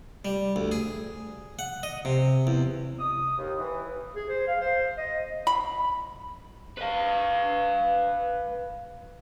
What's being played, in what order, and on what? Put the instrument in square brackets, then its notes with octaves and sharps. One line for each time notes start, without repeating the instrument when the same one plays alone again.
[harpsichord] G3
D2
G#4
F#5
D#5
C3
E2
[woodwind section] D#6
D#2
E3
[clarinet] G#4
C5
F5
C5
D#5
[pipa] B5
[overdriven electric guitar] B4 F5